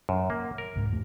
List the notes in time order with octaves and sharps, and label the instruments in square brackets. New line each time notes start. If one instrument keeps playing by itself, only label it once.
[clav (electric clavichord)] F#2
A#3
A#4
[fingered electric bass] C#2 G#2
E2 A3